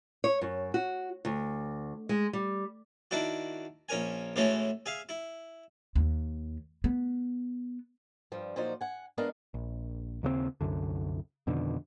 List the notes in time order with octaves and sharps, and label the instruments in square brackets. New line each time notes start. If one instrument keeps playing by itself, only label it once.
[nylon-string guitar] C#5
F#2
F#4
D2
G#3
G3
[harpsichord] D#3 D4 E4 F#4
A#1 C#4 A#4 G#5
A2 E3 G#3 A3 C#4 F#4
G#4 E5 F5
E4
[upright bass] D#2
B3
[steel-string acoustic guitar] G2 F3 G3
A#2 F3 F#3 D#4 C5 D5
F#5 G#5
G#3 B3 D4 A#4 D#5 F5
[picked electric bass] A#1
D#2 C#3 A3 C4
C2 F#2 D3
F2 B2 D3 D#3